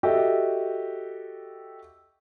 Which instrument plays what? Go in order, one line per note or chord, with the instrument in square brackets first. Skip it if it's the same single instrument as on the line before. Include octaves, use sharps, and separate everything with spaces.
[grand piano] F#4 G4 A4 D#5 E5